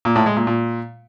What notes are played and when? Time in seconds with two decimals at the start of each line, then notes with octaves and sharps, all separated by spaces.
0.05 A#2
0.16 A2
0.26 G#3
0.36 A#2
0.47 A#2